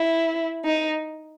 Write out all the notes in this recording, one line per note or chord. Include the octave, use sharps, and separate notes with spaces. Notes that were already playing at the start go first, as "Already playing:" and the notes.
Already playing: E4
D#4